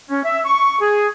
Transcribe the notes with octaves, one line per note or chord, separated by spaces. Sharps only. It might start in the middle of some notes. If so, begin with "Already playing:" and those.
C#4
E5
C#6
G#4